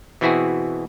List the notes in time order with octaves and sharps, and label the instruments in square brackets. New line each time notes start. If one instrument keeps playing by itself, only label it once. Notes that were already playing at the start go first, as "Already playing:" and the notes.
[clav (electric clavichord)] B2 E3 C4 E4 F#4 G#4